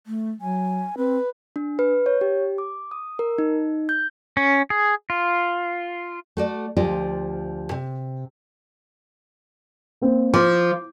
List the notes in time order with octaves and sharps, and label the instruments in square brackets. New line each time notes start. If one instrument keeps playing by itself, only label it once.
[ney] A3
[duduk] F#3 [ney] G#5
[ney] C4 [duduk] B4
[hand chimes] D4
B4
C#5
G4
D6
D#6
A#4
D#4
G6
[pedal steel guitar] C#4
G#4
F4
[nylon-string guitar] A3 F#4 D5
D2 F3 F4 G4 D5 D#5
C3
[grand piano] A#3 C4
[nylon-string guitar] F3 [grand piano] D6